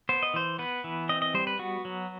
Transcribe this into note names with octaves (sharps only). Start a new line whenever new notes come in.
B3 C5
D#5
E3 C5
B3 B4
E3
C4 D#5
D#5
G3 C5
B4
B3 F#4
F#3